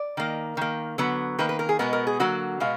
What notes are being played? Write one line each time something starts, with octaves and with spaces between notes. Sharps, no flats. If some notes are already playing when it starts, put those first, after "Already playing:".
Already playing: D5
D#3 A#3
D#3 A#3
D3 F#3 B3
D#3 A#3 B4
B4
A#4
G#4
B2 G#3 B3 A#4
A#4
G#4
D3 F#3 A#3 F#4
B2 G#3 B3 F5